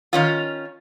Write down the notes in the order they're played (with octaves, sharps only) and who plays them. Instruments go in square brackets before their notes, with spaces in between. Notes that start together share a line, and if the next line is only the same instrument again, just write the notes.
[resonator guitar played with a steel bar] D#3 C#4 F4